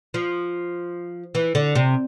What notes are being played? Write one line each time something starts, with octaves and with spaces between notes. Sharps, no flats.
F3
E3
D3
C3